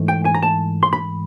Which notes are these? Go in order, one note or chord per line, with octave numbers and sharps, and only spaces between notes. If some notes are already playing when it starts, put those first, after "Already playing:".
Already playing: G#2 E3 A3
G5
G#5
A#5
A5
C6
B5